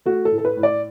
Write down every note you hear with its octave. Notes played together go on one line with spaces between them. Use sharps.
A3 F#4
A4
A2
A4
B4
A2
D5